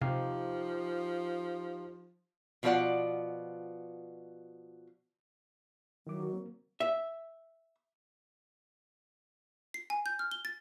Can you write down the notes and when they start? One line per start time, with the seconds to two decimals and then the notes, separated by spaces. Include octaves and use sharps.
0.02 C3 F3 D#4 G4 F5
2.63 B2 F3 F4 A4 D5 F#5
6.07 D#3 F#3 E4 D6
6.20 D#3 F#4
6.32 A#3 C4
6.80 E5
9.74 C7
9.90 G#5
10.06 G6
10.19 F6
10.31 G7
10.45 A6